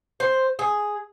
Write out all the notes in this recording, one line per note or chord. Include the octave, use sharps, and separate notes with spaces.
C5
G#4